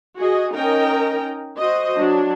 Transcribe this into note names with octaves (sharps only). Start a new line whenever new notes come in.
F#4 G#4 D#5
C#4 D#4 A#4 D#5 G5 A#5
F#4 C5 D#5
F#3 D4